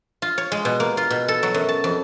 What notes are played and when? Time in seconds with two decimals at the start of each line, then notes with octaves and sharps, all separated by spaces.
0.22 F4
0.38 C#5
0.52 G#3
0.65 B2
0.80 A#3
0.97 F4
1.11 B2
1.28 A4
1.43 F#3
1.54 F#2
1.69 A5
1.84 F2